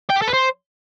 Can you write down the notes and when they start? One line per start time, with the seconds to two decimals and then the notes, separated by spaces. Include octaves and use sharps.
0.10 G5
0.16 G4
0.22 A4
0.28 B4
0.34 C5